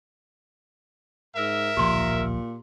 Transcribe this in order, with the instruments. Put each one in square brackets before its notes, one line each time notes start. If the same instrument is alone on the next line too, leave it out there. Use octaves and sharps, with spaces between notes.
[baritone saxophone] G#2 [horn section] A#4 E5
[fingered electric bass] D1 A#1 F3 [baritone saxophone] A#2 [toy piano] G4 A#5 C6